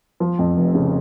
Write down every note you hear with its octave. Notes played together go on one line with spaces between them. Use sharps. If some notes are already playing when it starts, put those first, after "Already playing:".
F3
F2
F1
C#3